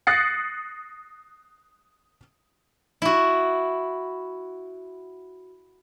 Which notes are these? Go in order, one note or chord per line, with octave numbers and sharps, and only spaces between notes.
D#6 F#6 A6 A#6 C7 C#7
E4 F#4